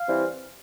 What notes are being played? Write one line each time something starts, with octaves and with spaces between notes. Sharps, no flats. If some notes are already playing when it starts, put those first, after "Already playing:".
Already playing: F5
E3 G3 C4